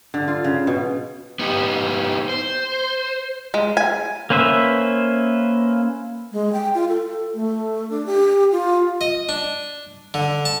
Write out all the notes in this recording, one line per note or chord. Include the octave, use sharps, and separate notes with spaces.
D3
F4
C#3
B2
B3 D#4 G4
C5
G#3
G#5
A#3 C#4 B4 C5 E5
G#3
G5
F4
A4
A3
D4
G4
F4
D#5
D4
D3
A5